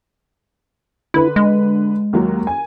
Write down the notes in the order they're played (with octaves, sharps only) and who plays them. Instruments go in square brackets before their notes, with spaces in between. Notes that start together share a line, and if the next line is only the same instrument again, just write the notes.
[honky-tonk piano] D3 B4 [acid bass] E4
[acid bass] G#3
[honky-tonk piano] D#2 F#3
G#5